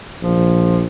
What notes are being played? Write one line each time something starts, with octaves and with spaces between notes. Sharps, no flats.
A#1 F3